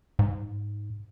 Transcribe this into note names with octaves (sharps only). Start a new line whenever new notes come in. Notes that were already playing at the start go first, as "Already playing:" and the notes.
G#2